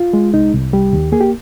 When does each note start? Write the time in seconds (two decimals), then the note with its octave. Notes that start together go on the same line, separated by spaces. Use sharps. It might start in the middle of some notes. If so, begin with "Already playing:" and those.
Already playing: F4
0.13 G#3
0.34 C2 D#4
0.54 C2
0.73 G3 G4
0.93 D#2
1.12 A#3 G#4
1.21 G4